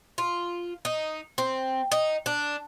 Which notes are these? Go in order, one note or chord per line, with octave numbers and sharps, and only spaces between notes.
F4
D#4
C4
D#4
D4